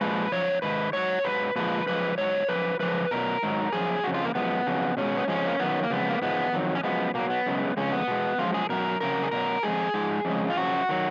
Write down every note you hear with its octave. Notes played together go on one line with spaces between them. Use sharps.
A#2 F3 G#3 B4
F#2 F3 C#5
G#2 D#3 B4
G#2 F#3 C#5
G#2 D#3 F#3 B4
A#2 F3 G#3 B4
F#2 F3 G#3 B4
G#2 F#3 C#5
F#2 F3 B4
F#2 F3 G#3 B4
B2 F#3 A#4
G#2 D#3 F#3
F#2 F3 G#4
F2 C#3 F#3 F#4
F4
A#3
F#2 F3 G#3 B3
F2 C#3 F#3
B2 G#3 C#4
B3
F2 F3 G#3 C#4
A#3
F#2 D#3 F#3 B3
A#3
F2 C#3 G#3 B3
A#3
G#2 F3 G#3 B3
F2 D#3 F#3
C#4
F#2 F3 G#3 B3
B2 F#3 A#3
B3
F#2 C#3 G#3
F2 C#3 G#3 C#4
B3
B2 G#3
F#2 F3 G#3 F4
G#4
B2 F#3 A#4
F2 C#3 F#3 A#4
G#4
B2 F#3 A#4
F2 F3 G#3 G#4
G#2 F3 G#3
F2 C#3 G#3
F4
F#2 C#3 F3 F#4
D#3 F#3